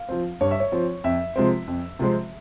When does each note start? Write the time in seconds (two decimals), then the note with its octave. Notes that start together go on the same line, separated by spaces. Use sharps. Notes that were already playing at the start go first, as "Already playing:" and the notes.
Already playing: F5
0.09 F3 C4
0.41 G2 C#5
0.51 E5
0.60 C#5
0.72 F3 C4
1.04 F2 E5
1.36 C3 F3 G#3 C4
1.67 F2
1.99 C3 F3 G#3 C4